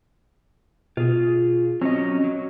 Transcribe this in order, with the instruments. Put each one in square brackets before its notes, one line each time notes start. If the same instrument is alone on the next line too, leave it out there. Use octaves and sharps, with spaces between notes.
[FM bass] B2 [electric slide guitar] F4 G#4
[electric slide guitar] F#3 C#4 D#5 [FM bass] C4
[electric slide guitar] F#3